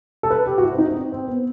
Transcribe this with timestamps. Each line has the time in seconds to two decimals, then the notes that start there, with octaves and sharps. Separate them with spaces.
0.23 A4
0.30 B4
0.47 G4
0.58 F#4
0.62 E4
0.73 C4
0.78 D#4
0.89 D#4
0.96 C4
1.12 C4
1.28 B3